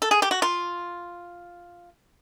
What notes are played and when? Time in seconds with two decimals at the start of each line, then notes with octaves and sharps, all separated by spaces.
0.02 A4
0.11 G#4
0.22 G4
0.31 F#4
0.42 F4